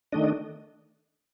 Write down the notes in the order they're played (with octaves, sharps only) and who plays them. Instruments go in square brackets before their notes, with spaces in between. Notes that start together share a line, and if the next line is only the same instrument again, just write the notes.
[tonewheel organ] D#3 A3 D4 D#5